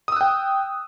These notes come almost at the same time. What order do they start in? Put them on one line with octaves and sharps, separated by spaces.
D#6 E6 F#6 G5